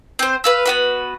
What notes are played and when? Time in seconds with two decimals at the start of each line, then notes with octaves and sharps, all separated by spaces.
0.19 C4 C5
0.44 B4 F5 E6
0.66 B3 F#4 B4